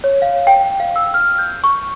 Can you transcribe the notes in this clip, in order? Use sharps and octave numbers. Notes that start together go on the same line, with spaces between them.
C#5
F5
G5
F5
E6
F6
G6
C#6